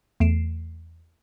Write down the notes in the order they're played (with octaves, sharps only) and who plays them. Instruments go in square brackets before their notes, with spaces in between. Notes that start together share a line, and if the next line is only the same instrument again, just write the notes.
[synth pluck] E2 A3 C7 D7 E7